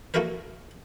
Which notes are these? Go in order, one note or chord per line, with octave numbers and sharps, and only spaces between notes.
A3 A#3 E4 F#4 A#4 B4